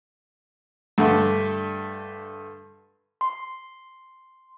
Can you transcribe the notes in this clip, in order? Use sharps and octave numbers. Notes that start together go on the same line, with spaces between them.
G2 D3 A3
C6